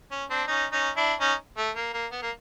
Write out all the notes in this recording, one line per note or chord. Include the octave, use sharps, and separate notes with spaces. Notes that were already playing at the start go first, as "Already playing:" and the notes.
C#4
C4 D4
C#4 D#4
C#4 D#4
D4 E4
C#4 D#4
A3
A#3
A#3
B3
A#3